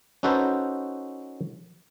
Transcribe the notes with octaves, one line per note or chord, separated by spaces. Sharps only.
C#4 D#4 F#4 A4 B4 C5